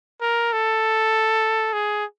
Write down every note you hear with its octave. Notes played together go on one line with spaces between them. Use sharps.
A#4
A4
G#4